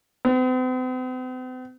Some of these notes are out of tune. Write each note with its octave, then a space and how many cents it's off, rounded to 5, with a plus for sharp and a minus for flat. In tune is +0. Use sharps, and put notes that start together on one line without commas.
C4 -45